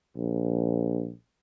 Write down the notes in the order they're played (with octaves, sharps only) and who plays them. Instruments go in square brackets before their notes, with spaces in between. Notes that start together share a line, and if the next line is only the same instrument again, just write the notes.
[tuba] A#1